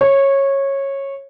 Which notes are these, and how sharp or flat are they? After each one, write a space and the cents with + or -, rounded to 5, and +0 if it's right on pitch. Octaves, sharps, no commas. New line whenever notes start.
C#5 -15